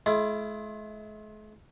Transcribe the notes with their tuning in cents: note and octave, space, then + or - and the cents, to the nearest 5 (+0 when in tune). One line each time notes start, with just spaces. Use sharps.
G#3 +45 E4 +35